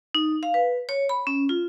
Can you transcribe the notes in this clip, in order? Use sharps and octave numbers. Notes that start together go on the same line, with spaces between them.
D#4
F5
B4
C#5
B5
C#4
F4